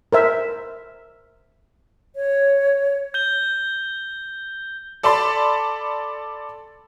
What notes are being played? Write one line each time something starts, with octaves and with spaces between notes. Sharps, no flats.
A#4 C5 E5
C#5
G6 G7
A4 D5 A5 B5 C6